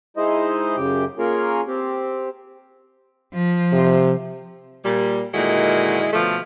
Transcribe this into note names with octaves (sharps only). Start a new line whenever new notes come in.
G#3 D#4 E4 C5 D#5
F#2 C#3 G4 G5
A#3 C#4 F4 G#4 A#4 C#5
C4 G4
F3
C3
A#2 G3
A#2 D3 D#3 G#3 E4 F#4
B2 D3 F3 A3